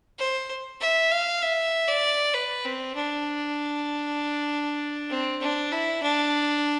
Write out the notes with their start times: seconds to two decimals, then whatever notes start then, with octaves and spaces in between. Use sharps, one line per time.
0.19 C5
0.80 E5
1.11 F5
1.42 E5
1.88 D5
2.34 B4
2.65 C4
2.95 D4
5.10 C4
5.41 D4
5.72 E4
6.02 D4